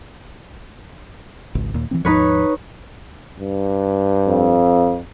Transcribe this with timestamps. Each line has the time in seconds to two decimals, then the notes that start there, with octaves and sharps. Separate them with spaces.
1.55 G#1 C#2
1.74 D#2 A#2
1.91 E3 G3 C4
2.05 D#2 G#2 F3 D#4 B4 C#5
3.40 G2
4.27 F2